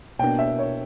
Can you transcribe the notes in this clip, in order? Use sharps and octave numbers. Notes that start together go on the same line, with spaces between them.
B2 A#3 D4 G5
E5
C#5